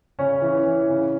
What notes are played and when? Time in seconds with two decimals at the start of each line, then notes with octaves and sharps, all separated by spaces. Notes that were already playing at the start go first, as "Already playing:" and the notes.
0.19 C#3 C#4 C#5
0.42 E3
0.66 E3
0.89 C#3